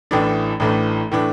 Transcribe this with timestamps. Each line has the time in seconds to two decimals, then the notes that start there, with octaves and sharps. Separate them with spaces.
0.11 A1 A2 E3 A3 D4
0.60 A1 A2 E3 A3 D4
1.12 A2 E3 A3 D4